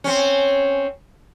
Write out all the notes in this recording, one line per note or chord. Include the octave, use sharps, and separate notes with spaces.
C4 C#4